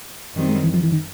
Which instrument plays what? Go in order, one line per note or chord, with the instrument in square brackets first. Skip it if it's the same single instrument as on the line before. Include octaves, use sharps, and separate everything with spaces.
[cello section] F#2 D#3 G3 C4
[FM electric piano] G#3
E3
F3
E3
D#3